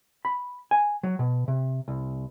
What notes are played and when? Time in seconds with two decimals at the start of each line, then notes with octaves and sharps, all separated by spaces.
0.25 B5
0.71 G#5
1.03 F#3
1.19 B2
1.48 C3
1.88 C2